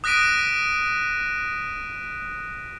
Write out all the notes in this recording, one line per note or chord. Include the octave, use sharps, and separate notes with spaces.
D#6 F#6 A#6 B6 D7 D#7